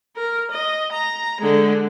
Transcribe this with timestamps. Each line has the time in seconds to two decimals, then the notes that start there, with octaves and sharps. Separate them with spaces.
0.16 A#4
0.51 D#5
0.92 A#5
1.40 D3 G#3